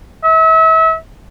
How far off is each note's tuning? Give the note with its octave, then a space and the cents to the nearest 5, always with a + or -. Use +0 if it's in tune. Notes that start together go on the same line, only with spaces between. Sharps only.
E5 -35